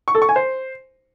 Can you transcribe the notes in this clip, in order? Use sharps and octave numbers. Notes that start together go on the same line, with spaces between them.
C#6
A4
C#6
G#5
C5